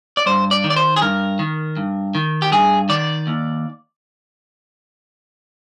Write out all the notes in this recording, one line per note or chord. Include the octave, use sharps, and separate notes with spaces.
D5
G2 C5
D5
D#3
D5
C5
G#4
G2 A#4
D#3
G2
D#3
G4
G2 G#4
D#3 D5
D#2